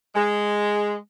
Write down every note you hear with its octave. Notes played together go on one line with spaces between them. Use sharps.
G#3